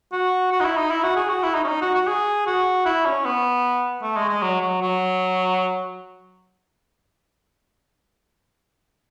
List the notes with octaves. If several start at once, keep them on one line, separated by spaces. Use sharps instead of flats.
F#4
F#4
D#4
E4
D#4
E4
F#4
G#4
F#4
E4
D#4
C#4
D#4
F#4
F#4
G#4
F#4
E4
C#4
B3
A3
G#3
G#3
F#3
F#3
F#3